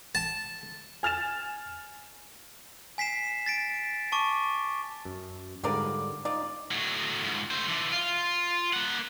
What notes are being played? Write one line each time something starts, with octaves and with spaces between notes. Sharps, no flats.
A5
G#5 F6 A6 E7
G#5 B6 C7 E7
A6 B6 D7
A5 C#6 D6
F#2
G#2 D3 G3 F4 A#4 D5
D#4 F4 D5
A2 F#3
C#2 G#2
A3 C5
E3 D4
F4
A#3 F#5